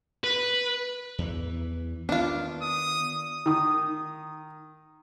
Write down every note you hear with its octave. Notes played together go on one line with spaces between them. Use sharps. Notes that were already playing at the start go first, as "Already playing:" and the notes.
B4
E2 E3
D#3 B3 D4 F4
D#6
D#3 D#6